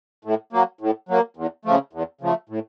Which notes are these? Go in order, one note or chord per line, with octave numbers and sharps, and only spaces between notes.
A2
F#3 A#3
A2
F#3 A#3
E2
C#3 F3 A3
E2
C#3 F3 A3
A2